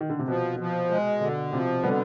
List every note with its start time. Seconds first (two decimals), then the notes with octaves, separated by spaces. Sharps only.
0.01 D#3
0.10 D3
0.19 C3
0.28 B2 F3
0.59 F3
0.90 G#3
1.21 B2 D3
1.52 C3 F3
1.84 D3 G3 B3